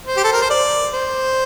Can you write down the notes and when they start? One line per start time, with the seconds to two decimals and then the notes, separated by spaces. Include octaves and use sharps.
0.07 C5
0.17 G4
0.24 A4
0.32 A#4
0.42 C5
0.50 D5
0.94 C5